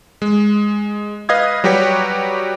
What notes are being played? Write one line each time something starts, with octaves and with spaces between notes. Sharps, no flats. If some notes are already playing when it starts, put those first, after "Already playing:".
G#3
B4 D#5 F5 D#6 G#6
F#3 G3 F#4 G4 B4 C#5